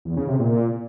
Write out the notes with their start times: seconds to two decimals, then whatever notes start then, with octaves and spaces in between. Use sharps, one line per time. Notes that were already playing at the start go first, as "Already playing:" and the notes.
0.05 E2
0.17 C#3
0.28 C3
0.39 A#2